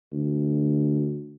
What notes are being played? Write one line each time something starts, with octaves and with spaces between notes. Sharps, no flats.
D2